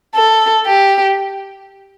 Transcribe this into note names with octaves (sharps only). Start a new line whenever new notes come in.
A4
G4